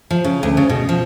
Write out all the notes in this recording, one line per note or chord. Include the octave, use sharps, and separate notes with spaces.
F3
C#3
D2
C#3
B2
F3